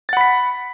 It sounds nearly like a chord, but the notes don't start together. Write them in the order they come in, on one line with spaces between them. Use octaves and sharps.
A6 F#5 B5 B6